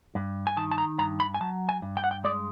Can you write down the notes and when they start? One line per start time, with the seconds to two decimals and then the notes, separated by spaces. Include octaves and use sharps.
0.15 G2
0.47 G#5
0.57 D#3 A5
0.71 A5
0.78 A#5
0.99 G2 A#5
1.20 B5
1.34 G#5
1.41 F#3 A5
1.69 G#5
1.82 G2
1.97 G5
2.04 F#5
2.11 G5
2.24 G#3 D5